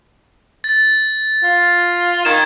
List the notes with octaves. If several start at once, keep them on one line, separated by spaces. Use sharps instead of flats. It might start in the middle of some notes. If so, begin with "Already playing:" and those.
A6
F4
D#3 G#6 E7